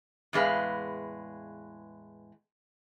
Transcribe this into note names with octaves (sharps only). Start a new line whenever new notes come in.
E2 A2 G#3 B4 F5